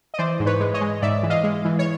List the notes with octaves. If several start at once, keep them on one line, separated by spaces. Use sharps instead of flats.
D#5
E3 C5 D5
G#2
B4 C#5
G#3
C#5 D#5
G#3
G#2 D5 E5
E3
D#5 F5
G#3
E3
C#5